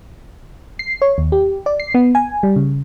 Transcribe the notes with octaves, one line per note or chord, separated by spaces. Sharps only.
C7
C#5
D#2
G4
D5
C7
B3
G#5
G3
C#3